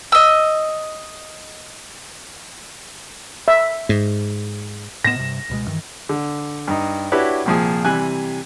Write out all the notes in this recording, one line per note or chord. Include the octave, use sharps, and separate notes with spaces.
D#5 E6
E5
G#2
A2 B3 A#6 E7
G2 C3
C#2 B2 G#3
G2 D#3 E3
D3
G2 D#4
D4 E4 F#4 G4 B4 C#5
C2 A#2 F3 G#4 D#6
C3 E3 G3 G#5 F#6